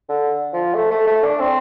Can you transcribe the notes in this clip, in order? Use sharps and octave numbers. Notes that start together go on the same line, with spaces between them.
D3
F3
A3
A3
A3
D4
C4